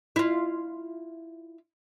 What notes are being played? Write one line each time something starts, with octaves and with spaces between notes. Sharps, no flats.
E4 F4